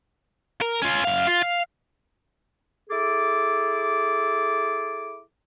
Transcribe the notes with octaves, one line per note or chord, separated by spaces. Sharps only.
A#4
C#4 F4
F#2 F5
F4
F5
E4 G#4 A4 D6